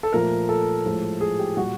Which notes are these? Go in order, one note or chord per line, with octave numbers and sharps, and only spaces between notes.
A4
A#2 F3 A3 A#4
A4
A2 F3 G#3
G#4
G4
A#2 G3 F#4